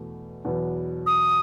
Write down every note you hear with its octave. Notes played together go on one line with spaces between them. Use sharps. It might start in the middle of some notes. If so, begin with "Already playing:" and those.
Already playing: E2 B2 A3
E2 B2 F#3 B3
D#6